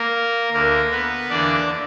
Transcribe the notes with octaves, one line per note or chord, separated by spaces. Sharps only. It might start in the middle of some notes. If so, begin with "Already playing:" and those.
Already playing: A#3 A#4
D2 D3 A#3 A#4
B3 B4
E2 D3 A#3 D4 D5